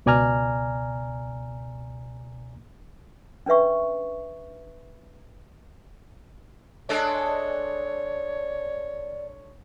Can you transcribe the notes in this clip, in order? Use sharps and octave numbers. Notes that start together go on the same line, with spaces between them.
C#2 B2 D5 G#5 A#5 F6
C#4 D4 B4 E5 C#6
G#3 D4 A4 C#5
D5